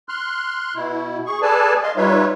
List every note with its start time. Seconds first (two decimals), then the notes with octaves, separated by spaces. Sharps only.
0.09 C6 F6 F#6
0.75 B2 E4
1.26 G#4 C#6
1.42 G#4 A4 B4 D5 G#5 A5
1.83 D#5 F5 C6
1.97 G3 D#4 F4 B4 C#5 E5